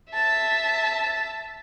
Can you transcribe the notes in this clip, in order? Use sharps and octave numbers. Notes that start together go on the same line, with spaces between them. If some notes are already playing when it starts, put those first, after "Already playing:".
E5 A5